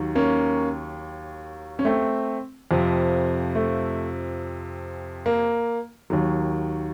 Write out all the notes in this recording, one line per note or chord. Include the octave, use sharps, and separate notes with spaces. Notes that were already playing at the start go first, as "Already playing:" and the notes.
Already playing: D#2 D#3 F#3
A#3 C#4
C#4
A3 C4
F2 C3 F3
A3
A#3
D#2 D#3 F#3